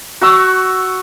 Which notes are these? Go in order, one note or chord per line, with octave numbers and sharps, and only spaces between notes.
F#4 C#6 E6